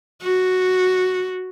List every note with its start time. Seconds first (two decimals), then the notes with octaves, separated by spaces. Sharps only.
0.23 F#4